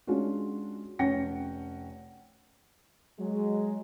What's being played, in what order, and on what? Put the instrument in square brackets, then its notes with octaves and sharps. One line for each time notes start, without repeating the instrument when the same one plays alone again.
[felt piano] G#3 C#4 D4 F4 F#4
F1 C#4 F#5 G5 A#6 C#7
[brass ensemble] F#3 G#3